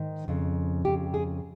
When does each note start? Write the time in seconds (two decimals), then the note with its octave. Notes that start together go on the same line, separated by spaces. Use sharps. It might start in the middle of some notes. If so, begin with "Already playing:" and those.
Already playing: G#2 D#3
0.28 F2 C#3
0.85 F2 C#3 G4
1.14 G#4